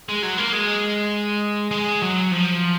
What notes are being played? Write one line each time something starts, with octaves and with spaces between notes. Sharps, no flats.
G#3
F#3
A#3
G#3
G#3
F#3
F3